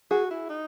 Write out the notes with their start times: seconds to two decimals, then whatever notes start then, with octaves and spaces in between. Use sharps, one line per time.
0.11 F#4 G#4
0.31 E4
0.49 D#4